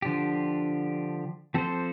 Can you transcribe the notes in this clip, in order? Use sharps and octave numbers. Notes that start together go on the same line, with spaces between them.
D3 F3 D4 G4
F3 C4 A4 C5